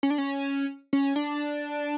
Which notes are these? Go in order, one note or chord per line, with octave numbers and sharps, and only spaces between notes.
C#4
D4
C#4
C#4
D4